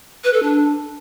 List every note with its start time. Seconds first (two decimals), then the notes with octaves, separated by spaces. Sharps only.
0.24 B4
0.33 A4
0.42 D4